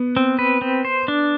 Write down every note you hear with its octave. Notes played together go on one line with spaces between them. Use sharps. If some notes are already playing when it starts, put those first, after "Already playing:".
Already playing: B3
C4
B4
C4
C5
D4